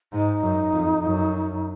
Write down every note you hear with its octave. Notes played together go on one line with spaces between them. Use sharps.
G#2 D#4
F#2
F2
F#2